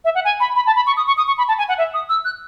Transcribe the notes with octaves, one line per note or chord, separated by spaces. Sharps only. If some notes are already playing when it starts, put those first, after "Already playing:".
E5
F#5
G#5
B5
B5
A5
B5
C#6
D#6
C#6
D#6
C#6
B5
A5
G#5
F#5
E5
D#6
E6
F#6